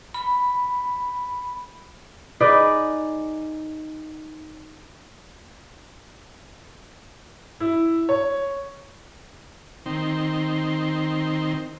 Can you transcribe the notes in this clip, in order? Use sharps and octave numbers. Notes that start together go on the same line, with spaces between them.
B5
D#4 G#4 B4 D5
E4
C#5
D#3 C4